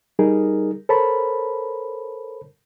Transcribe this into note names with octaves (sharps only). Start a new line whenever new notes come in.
G3 D#4 G#4 A#4
A4 A#4 C5 C#5 A5 B5